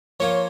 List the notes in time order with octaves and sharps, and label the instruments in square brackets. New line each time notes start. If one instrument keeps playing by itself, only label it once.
[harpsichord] F3 A#3 F4 [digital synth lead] C#5